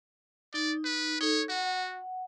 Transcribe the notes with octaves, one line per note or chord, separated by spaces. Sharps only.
D#4 D5
B4
D#4 A4 C#5
F#4 F#5